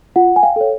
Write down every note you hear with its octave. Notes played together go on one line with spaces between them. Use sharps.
F4 F#5
G#5
F5 G5
A4 C#5